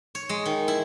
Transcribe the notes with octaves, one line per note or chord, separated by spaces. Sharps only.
C#5
G#3
D#3
E4